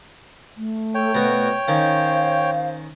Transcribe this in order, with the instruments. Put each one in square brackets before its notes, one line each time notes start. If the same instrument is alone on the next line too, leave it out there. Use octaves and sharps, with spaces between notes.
[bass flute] A3
[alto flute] A4 [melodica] C#5 G5
[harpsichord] B2 F#4 [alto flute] C5
[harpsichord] D#3 C#4 [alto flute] C5 [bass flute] F5